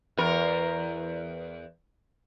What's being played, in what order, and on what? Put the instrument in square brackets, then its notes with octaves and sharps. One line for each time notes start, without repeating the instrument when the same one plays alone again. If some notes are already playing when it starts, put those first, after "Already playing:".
[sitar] E2 A#4